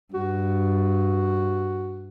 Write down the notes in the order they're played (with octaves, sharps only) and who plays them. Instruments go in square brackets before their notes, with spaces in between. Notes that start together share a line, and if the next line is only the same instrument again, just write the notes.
[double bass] G2 [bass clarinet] F#4